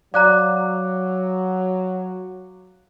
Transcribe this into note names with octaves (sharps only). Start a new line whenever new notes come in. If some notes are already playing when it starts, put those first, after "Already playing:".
F#3 D5 F5 A#5 D6 F#6